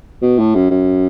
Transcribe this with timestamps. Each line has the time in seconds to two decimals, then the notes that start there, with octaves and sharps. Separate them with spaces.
0.22 B2
0.39 A2
0.55 F#2
0.71 F#2